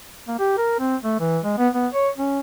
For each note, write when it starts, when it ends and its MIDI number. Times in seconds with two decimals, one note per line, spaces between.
0.28 0.36 58
0.39 0.58 67
0.58 0.76 70
0.79 0.96 60
1.03 1.19 57
1.20 1.39 52
1.44 1.57 56
1.58 1.68 59
1.74 1.87 59
1.94 2.09 73
2.18 2.40 61